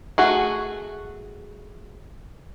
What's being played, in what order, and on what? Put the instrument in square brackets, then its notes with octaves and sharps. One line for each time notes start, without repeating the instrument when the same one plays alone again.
[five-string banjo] A3 F#4 G#4